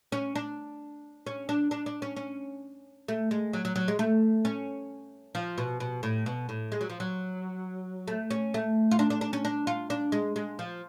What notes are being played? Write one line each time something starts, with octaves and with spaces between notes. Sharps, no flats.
C#4
D4
C#4
D4
D4
D4
C#4
C#4
A3
G#3
F#3
F#3
F#3
G#3
A3
C#4
F3
B2
B2
A2
B2
A2
G#3
F#3
F3
F#3
A3
C#4
A3
F4
D4
D4
D4
C#4
D4
F4
D4
G#3
G#3
F3